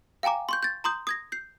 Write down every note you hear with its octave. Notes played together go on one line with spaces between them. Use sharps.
F5 G5 G#5 A#5 D6
C6 C#6 G6
G6 A6
A#5 C6 D#6 G6
D#6 G#6 A#6
G6 C7